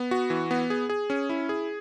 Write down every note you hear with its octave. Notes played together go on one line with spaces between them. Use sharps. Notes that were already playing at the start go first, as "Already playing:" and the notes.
Already playing: B3
F#4
E3
B3
G#4
G#4
C#4
E4
G#4